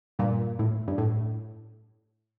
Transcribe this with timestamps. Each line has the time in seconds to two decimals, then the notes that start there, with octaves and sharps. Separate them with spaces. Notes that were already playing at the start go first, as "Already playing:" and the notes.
0.19 G2 A#2
0.59 A2
0.88 G2
0.98 A2